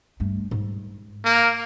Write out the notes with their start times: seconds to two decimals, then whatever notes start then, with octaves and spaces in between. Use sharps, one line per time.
0.20 G2 A3
0.51 G#2
1.25 A#3